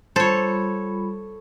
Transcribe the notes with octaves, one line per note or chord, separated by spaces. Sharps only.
G3 F4 A4 C5 C#5 B5